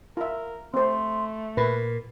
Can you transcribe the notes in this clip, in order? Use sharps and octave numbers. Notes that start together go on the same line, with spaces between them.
F4 A#4 E5
A3 C4 C5 C6
A#2 A#4 B4